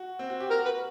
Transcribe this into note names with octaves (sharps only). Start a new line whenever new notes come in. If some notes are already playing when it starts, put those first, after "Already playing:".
Already playing: F#4
C4
F#4
G4
F#4 A#4
F#4 B4